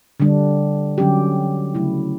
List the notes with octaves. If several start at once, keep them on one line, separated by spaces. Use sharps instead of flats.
D3 G3 D4
D3 F#3 C#4 G4
C#3 F#3 A3 E4